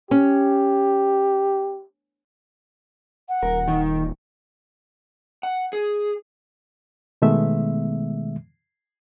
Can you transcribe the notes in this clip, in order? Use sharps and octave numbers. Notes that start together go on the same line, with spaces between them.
C#4 G4
F#5
D#1 A#4
D#3
F#5
G#4
B2 D#3 G#3 A3 B3 E5